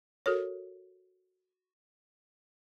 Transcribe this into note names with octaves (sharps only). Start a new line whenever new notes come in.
F#4 A4 A#4 C#5